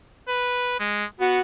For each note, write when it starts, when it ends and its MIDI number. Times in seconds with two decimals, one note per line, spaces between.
0.28 0.77 71
0.80 1.05 56
1.20 1.40 59
1.20 1.41 66